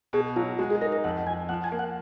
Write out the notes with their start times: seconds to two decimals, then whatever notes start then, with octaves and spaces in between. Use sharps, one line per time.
0.13 B2 G#4
0.36 F#3 F4
0.59 G#3 F#4
0.70 G#4
0.81 D#4 A#4
0.92 A#4
1.04 F2 F#5
1.27 F3 G#5
1.49 F3 F#5
1.64 G#5
1.72 A#3
1.79 F#5